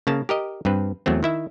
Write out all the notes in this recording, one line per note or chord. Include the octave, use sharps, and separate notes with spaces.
C#3 A#3 A5
G4 A#4 D#5
G2 C4 B4
E2 F#3 A3 C4
D#3 E4 E5